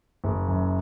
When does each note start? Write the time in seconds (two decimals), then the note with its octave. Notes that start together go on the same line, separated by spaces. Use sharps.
0.24 F#1
0.48 F#2